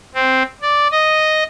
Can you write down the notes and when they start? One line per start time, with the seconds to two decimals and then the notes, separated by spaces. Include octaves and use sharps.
0.15 C4
0.62 D5
0.91 D#5